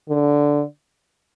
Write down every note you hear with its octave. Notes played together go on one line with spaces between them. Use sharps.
D3